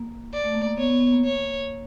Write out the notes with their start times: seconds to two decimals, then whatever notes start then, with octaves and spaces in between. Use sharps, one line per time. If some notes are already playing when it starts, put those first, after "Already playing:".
Already playing: A#3
0.33 D5
0.44 A3
0.55 A#3
0.67 A#3
0.77 B3 C#5
0.89 B3
1.01 B3
1.13 A#3
1.24 C#5